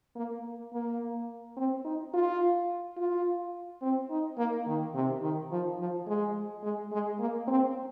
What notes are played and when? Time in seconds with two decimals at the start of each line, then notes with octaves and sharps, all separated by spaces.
0.16 A#3
0.73 A#3
1.57 C4
1.85 D#4
2.13 F4
2.97 F4
3.82 C4
4.10 D#4
4.38 A#3
4.67 D#3
4.94 C3
5.22 D#3
5.51 F3
5.79 F3
6.07 G#3
6.63 G#3
6.92 G#3
7.20 A#3
7.48 C4